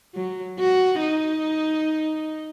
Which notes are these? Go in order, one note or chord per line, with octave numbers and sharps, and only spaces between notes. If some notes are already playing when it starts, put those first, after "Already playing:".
F#3
F#4
D#4